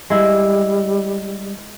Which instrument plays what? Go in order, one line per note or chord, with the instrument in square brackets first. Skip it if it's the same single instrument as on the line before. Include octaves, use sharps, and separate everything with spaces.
[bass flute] G3 [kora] G#3 E4